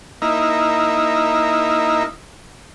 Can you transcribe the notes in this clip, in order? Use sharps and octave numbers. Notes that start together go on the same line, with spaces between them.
A#3 D#4 E4